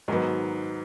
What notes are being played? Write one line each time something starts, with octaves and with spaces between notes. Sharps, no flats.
G#2 D#3 F#3 B3